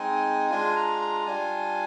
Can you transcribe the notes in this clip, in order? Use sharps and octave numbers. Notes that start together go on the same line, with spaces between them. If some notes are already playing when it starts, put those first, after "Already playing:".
Already playing: G#3 C4 D#4 G#5
G#3 D4 F4 G#5
A#5
A#5
G3 D4 F4 G#5